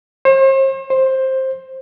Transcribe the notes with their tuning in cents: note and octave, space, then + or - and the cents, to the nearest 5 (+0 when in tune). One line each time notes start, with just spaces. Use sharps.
C5 +40
C5 +10